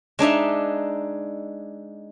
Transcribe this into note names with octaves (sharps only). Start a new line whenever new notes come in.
G#3 D4 D#4 E5